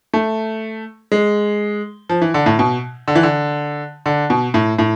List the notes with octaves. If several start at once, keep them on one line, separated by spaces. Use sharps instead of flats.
A3
G#3
F3
E3
D3
A2
B2
D3
E3
D3
D3
B2
A2
A2